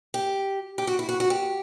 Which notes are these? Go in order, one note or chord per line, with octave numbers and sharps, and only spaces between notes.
G4
G4
F#4
E4
F#4
F#4
G4